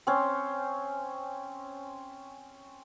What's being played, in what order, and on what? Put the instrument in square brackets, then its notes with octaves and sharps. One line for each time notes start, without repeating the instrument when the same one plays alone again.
[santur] C4 C#4 C5